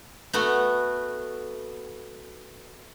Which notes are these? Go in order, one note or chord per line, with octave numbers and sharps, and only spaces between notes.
A3 B3 F#4